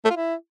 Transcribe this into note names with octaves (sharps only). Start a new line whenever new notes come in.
A3
F4
E4